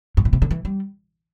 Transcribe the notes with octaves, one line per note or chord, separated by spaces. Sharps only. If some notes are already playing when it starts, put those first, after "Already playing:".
G2
A2
C3
D3
E3
G3